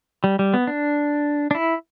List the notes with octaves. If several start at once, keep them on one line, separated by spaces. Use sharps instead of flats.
G3
G3
B3
D4
D4
E4